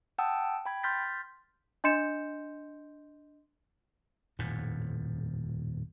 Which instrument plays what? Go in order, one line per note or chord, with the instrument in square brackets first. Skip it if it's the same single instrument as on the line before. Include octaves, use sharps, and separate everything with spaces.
[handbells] F#5 G5 A5 D#6 E6
G5 B5 G#6
C6 F6 G6 A6 B6
[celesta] D4 D#5 C6 G6 C#7 E7
[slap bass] D#1 F2 A2